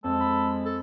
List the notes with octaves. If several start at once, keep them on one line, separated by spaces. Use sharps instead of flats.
F2 G#3 A4
B5
A4